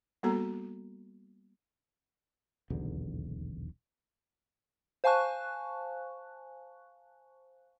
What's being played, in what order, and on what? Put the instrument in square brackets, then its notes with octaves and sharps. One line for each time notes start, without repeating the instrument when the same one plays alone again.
[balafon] G3 A#3 B3 F#4 A4 A#5
[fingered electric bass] D#1 B1 E2 D3
[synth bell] C5 F5 G#5 A5 C#6 F#6